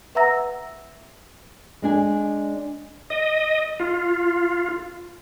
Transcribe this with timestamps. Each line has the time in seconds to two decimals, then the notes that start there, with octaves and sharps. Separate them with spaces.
0.15 B4 E5 F#5 A#5 E6 A#6
1.82 G#3 D4 G#5
3.10 D#5
3.80 F4